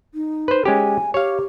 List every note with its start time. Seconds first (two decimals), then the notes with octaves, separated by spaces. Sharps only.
0.14 D#4
0.48 B4 C5
0.65 G#3 C#4 G4 G#5
1.14 G4 C#5 F5